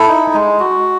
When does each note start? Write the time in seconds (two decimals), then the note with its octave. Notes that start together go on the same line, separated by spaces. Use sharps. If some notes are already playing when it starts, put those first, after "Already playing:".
Already playing: E4 A4
0.08 D#4
0.34 G#3
0.59 F#4